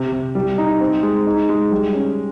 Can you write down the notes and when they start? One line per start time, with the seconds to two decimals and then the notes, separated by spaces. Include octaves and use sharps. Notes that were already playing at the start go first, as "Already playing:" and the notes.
Already playing: C3
0.12 C3
0.35 G3
0.58 D#4
0.80 C4
1.03 G#3
1.27 D#4
1.49 G#3
1.71 G3
1.95 C#4